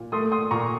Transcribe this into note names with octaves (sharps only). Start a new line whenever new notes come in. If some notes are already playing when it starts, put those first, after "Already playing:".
Already playing: A#2
A3 C6 D#6
C6 D#6
A#2 A#5 C#6